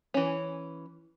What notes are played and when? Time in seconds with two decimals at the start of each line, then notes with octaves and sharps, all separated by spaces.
0.14 E3 C#4